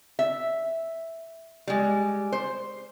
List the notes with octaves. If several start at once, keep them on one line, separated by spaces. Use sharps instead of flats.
E5
G3 G#3
C5